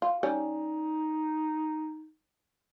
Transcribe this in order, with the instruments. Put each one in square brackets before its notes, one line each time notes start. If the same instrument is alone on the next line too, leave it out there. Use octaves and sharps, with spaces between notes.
[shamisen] F4
[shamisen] G3 C#4 [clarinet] D#4